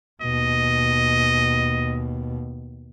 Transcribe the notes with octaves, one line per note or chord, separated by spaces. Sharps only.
D#2 B2 D#5